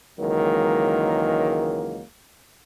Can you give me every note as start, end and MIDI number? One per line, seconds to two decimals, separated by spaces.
0.20 2.03 37
0.20 2.03 51
0.20 2.03 52
0.20 2.03 54
0.20 2.03 56
0.20 2.03 58